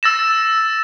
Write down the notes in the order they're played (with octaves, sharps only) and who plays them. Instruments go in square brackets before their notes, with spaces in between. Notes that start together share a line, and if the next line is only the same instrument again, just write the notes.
[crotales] E6 A6 A#6 E7